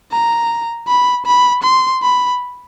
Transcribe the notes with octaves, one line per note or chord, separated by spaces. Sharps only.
A#5
B5
B5
C6
B5